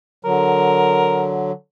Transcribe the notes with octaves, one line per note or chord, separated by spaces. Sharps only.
D3 F#3 A#4